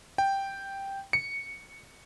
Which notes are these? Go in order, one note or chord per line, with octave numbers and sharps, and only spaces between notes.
G5
C#7